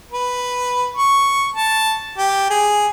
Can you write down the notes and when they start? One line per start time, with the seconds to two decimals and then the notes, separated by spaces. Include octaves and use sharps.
0.12 B4
0.97 C#6
1.55 A5
2.18 G4
2.50 G#4